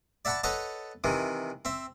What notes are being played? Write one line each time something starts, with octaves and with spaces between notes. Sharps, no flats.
D5 E5 F#5 A5 B5 C#6
A4 B4 C#5 D#5 F#5 A5
C3 D#3 E3
C4 E5